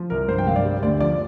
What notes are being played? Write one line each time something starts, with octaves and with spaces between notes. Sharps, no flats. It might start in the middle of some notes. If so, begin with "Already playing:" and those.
Already playing: F3
C2 A#4
G2 C5
G5
G2 F5
D5
G3
D2 D5
F3 D5